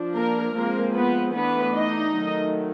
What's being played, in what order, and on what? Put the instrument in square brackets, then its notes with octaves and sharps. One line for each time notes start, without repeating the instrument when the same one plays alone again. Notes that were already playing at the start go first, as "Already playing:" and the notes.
Already playing: [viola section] F3 D4
A#3 A#4
F3 G#3 A#3 C4 A#4
B3 B4
E3 A3 B3 D4 B4
D#4 D#5
D#3 F#3 A3